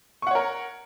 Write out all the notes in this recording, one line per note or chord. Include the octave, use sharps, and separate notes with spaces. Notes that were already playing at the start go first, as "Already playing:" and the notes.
A#4 C#5 F#5 C#6